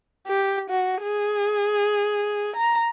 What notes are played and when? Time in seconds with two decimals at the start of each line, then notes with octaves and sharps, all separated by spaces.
0.27 G4
0.70 F#4
1.03 G#4
2.56 A#5